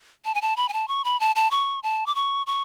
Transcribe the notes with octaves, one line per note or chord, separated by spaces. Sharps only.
A5
G#5
A5
B5
G#5
A5
C#6
B5
A5
A5
C#6
A5
D6
C#6
C#6